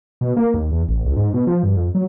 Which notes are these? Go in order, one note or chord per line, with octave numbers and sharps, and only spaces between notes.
B2
A#3
D#2
E2
A1
C#2
G#2
B2
F3
G2
F2
F#3